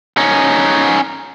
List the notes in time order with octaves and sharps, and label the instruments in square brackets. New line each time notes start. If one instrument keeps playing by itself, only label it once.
[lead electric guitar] C#4 D#4